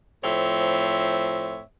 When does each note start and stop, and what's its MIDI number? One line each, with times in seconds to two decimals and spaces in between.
0.23 1.61 45
0.23 1.61 53
0.23 1.61 60
0.23 1.61 73
0.23 1.61 76